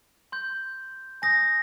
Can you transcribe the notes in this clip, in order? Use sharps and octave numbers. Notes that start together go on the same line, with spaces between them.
C6 G6
G#5 D#6 G6 A#6